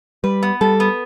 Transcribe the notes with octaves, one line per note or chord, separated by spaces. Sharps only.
G3 B4
B3
G3 A4
B3